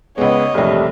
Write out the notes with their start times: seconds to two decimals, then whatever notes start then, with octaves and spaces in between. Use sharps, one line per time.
0.18 C#2 G#3 B3 C#5 D#5
0.54 E1 A#1 C3 G3 A3